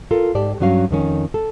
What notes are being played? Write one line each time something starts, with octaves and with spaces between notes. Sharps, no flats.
F4 A4 A#4
G#2 G4 D5 A5
G2 F#3 C#4 F#4 F5
F2 D#3 C#4
A4